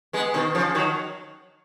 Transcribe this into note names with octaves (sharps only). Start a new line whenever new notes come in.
G#3 B3
B2 D#3
C#3 F3
D#3 F#3